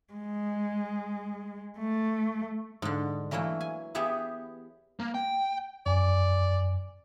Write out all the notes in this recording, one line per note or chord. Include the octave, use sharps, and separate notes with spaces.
G#3
A3
G#2 D3
E3 F#3 A3 A#3 E4
G#5
B3 G4 G#4 E5 F#5
A#3
G5
F#2 D5 G#5